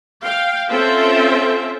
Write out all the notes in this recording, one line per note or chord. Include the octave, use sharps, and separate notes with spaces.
F5 G5
C4 C#4 F4 A4 C5 E5